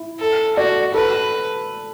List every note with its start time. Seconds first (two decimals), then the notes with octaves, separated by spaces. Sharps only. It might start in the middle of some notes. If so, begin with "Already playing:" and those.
Already playing: E4
0.19 A4
0.57 F#4 D5
0.94 A4 B4